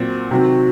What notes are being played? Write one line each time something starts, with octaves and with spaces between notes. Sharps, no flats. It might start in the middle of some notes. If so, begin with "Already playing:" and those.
Already playing: A#2 F#3 C4
C3 D#3 F#3 C4 F#4